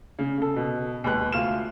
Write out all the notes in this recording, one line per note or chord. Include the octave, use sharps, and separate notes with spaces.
C#3
C#3 A4
B2
D#2 G#3 B4 F#6
D2 F4 F6 E7